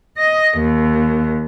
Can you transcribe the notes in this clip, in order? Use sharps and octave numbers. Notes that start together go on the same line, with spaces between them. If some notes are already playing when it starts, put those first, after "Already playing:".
D#5
D#2